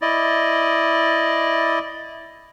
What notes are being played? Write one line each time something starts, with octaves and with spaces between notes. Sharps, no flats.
E4 D5 D#5